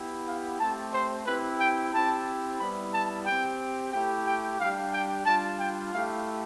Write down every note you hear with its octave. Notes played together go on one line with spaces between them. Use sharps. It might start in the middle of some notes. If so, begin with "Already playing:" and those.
Already playing: B3 E4 G4
F5
A3 C4 G4 A5
C5
C4 E4 G4 B4
G5
C4 E4 G4 A5
G3 B3 E4 B5
A5
C4 G4 G5
A3 E4 G4 G5
G5
G3 D4 G4 F5
G5
G3 D4 F4 A5
G5
A3 E4 G4 F5